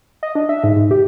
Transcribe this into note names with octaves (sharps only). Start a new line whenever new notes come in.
D#5
D4
E5
G#2
G#2
G4